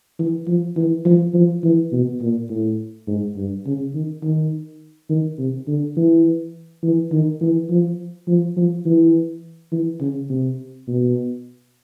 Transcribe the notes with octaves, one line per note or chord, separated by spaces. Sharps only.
E3
F3
E3
F3
F3
E3
B2
A#2
A2
G#2
G2
C#3
D#3
D#3
D#3
C3
D3
E3
E3
D#3
E3
F3
F3
F3
E3
E3
C#3
C3
B2